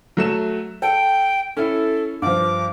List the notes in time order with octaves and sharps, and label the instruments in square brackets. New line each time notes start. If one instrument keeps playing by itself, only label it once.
[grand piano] F#3 A3 E7
[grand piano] A4 [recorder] G5
[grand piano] C#4 E4 [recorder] A4
[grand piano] G2 F3 [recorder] D6